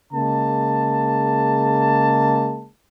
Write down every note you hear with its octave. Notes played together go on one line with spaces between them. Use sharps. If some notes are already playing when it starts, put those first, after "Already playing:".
C#3 G#3 A#3 A5